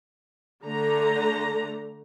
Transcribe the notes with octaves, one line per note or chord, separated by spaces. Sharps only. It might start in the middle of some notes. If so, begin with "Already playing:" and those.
D3 A3 A#5